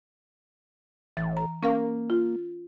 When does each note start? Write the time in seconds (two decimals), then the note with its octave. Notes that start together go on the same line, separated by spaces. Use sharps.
1.17 A1 E3 A6
1.37 A#5
1.63 A#3 C#4 A#4 F5
2.10 F4